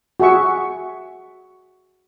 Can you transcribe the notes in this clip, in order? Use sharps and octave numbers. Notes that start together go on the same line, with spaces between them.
F#4 G#4 E5 C#6